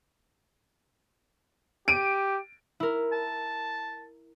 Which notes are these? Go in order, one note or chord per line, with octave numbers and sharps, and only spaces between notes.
G4 D7 D#7
E4 A#4
A5